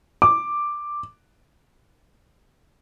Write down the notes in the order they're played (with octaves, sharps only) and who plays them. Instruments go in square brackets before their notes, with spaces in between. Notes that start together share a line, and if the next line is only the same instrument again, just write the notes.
[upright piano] D6